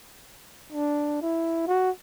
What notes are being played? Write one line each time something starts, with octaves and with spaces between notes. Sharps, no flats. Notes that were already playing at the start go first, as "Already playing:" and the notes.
D4
E4
F#4